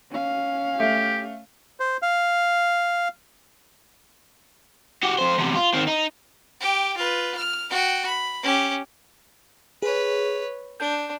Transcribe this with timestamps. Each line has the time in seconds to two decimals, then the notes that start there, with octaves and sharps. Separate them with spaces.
0.10 C#4 F5
0.80 A3 G4
1.80 C5
2.02 F5
5.03 F#4 G4
5.19 F2 C5
5.38 E2 C3
5.56 F4
5.75 D#3 C4
5.88 D#4
6.61 G4 G5
6.97 F4 B4
7.37 F6
7.71 F#4 G5
8.06 B5
8.43 C#4 G4
9.82 G#4 B4 C#5
10.80 D4 G6